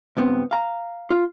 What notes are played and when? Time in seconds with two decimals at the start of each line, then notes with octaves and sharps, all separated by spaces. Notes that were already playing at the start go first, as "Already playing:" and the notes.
0.17 C#2 G2 B3 C4
0.51 F5 A#5
1.10 F4